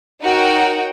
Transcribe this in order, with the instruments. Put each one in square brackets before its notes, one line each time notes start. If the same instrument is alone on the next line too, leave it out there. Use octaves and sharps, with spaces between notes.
[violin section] D#4 F#4 A#4 C#5 F#5 G5